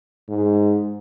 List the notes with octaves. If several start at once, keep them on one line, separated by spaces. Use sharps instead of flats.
G#2